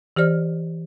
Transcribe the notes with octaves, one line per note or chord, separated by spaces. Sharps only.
E3 G4 C5 D5 F6